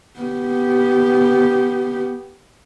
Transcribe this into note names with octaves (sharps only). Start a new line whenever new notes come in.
B3 G4